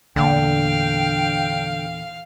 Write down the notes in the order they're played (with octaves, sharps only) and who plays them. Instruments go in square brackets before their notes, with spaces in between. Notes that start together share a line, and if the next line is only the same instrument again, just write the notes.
[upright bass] E2 A#2 [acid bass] D3 [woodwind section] D4 G5 [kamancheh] F5